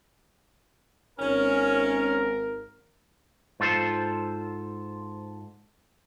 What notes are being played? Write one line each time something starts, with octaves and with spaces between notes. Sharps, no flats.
G#1 C#4 A#4
G#2 F4 A4 C5